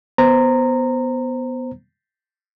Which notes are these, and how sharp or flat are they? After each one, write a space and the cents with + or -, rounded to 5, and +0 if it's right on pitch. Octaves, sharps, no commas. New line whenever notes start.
B3 +0 C5 +0 A#5 -15